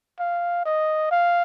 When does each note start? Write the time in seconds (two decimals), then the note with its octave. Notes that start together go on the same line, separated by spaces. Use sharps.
0.20 F5
0.65 D#5
1.11 F5